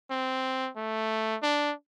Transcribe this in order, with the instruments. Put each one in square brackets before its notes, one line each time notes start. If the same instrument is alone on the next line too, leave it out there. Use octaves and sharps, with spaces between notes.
[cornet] C4
A3
D4